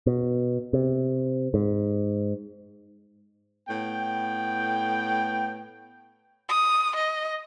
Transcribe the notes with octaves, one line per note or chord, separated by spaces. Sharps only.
B2
C3
G#2
A2 B3 G5
D#6
D#5